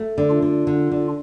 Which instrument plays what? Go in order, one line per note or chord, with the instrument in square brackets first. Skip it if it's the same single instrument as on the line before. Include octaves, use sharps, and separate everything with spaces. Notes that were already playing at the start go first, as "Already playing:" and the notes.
Already playing: [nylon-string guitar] A3
D3
[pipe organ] D4 F4
[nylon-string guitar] D3
D3
D3